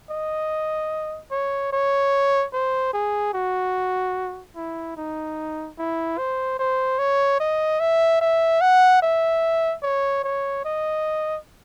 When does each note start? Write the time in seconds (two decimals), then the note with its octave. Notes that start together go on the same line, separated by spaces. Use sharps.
0.10 D#5
1.32 C#5
1.73 C#5
2.53 C5
2.93 G#4
3.34 F#4
4.56 E4
4.97 D#4
5.78 E4
6.18 C5
6.59 C5
6.99 C#5
7.40 D#5
7.80 E5
8.21 E5
8.61 F#5
9.02 E5
9.83 C#5
10.24 C#5
10.65 D#5